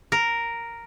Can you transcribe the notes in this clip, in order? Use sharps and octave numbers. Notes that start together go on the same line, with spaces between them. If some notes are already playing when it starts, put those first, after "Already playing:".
A#4